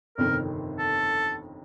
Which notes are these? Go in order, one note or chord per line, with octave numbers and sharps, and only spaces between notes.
G1 F2 C3 D#3 A#4
A4